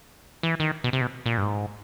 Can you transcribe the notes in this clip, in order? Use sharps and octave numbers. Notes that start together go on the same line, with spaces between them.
E3
D#3
B2
C3
B2
A#2
G2
G#2